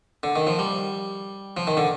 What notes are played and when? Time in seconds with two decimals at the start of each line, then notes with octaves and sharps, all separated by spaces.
0.23 D3
0.36 D#3
0.47 F3
0.59 G3
1.57 F3
1.67 D#3
1.77 D3